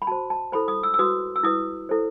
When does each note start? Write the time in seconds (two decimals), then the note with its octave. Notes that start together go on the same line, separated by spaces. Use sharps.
0.02 B5
0.07 F#4 C5 A5
0.30 A5
0.52 E4 A4 C5 B5
0.68 D#6
0.83 E6
0.94 E6
0.99 F#4 B4 D#6
1.36 E6
1.44 E4 B4 D#6
1.89 E4 A4 C5